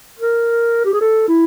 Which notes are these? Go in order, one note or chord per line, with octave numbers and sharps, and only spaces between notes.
A#4
G4
G#4
A4
E4